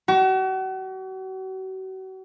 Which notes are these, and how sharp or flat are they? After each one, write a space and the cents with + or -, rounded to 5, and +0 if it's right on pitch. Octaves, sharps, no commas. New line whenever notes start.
F#4 +40